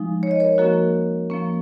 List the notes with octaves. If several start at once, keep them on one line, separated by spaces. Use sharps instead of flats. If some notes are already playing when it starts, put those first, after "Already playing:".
Already playing: F3 G#3 D#4
C#5
D#5
A#4 C#5
F3 A#3 C#4 F#4 A#4
F3 A#3 C#4